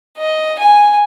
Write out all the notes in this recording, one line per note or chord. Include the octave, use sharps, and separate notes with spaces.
D#5
G#5